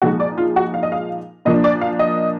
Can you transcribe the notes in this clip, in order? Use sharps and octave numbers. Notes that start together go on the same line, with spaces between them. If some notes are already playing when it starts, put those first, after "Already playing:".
A#2 F3 G#3 D#4 F#4
D5
F4
F#4
F5
D#5
F5
A#2 F3 A#3 D4 D#5
D5
F5
D#5